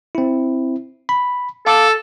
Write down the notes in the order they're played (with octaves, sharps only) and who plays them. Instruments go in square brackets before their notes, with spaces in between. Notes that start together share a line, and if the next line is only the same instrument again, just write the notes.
[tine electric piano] C4 E4
B5
[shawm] A4 [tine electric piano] F5 A5 D6